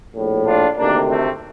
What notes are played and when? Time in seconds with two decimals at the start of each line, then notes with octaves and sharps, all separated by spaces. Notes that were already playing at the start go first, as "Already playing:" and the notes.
0.15 A#1 A2
0.46 D4 F4
0.77 D2 C3 D#3 A#3 D4
1.09 A3 C4